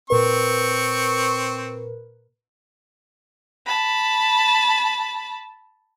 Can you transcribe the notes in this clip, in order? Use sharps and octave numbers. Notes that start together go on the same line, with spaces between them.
A#2 C4 A#4 B4 C#6
A5 B5